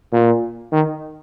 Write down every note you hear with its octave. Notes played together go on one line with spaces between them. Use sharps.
A#2
D#3